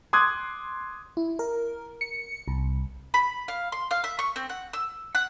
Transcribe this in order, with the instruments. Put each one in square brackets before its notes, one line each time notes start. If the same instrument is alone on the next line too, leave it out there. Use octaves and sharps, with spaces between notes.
[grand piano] C6 D6 D#6 F#6 G#6
[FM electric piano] E4
A#4
C#7
C2
[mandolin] B5
F5
C6
F5
E5
C#6
C4
F#5
E6
F#5